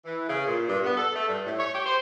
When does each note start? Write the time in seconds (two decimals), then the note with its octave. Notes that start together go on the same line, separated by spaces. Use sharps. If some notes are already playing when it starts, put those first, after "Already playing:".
0.05 E3
0.28 C#3
0.46 A#2
0.68 G2
0.83 B3
0.97 A4
1.14 A3
1.28 G2
1.45 A2
1.57 C#5
1.74 G4
1.86 C5